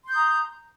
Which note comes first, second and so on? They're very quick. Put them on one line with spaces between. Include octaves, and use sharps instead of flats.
C6 G6 D#6 A#5